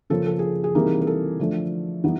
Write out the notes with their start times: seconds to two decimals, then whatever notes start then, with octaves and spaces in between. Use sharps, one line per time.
0.10 C#3 F3 A#3 C#4 A4
0.26 A4
0.39 G#4
0.64 G#4
0.75 C3 E3 G3 A#3 D#4
1.01 A#4
1.07 A4
1.40 D3 F3 A3
2.04 E3 G3 B3 D#4